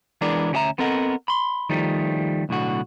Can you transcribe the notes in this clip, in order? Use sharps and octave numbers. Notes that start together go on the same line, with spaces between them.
E3 G#3 B3 D4 A#4 D5
D2 C#4 F4 G4 E5 A#5
B3 C4 A4 A#4 D#5 F#5
B5 C6
D#3 F3 G3 A3 D#4
B1 A2 D3 F#4